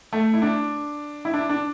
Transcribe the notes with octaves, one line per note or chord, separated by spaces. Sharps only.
A3
E4
D4
E4
D4
D4